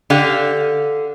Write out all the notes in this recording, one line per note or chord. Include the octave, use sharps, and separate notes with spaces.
D3 G4 F5